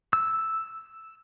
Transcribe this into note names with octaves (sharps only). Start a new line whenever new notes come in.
E6